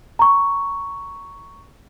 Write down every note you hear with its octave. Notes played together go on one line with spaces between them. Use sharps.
A#5 C#6